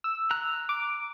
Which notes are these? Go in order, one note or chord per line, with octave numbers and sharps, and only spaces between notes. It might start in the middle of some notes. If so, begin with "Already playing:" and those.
E6
A#5 F#6
D6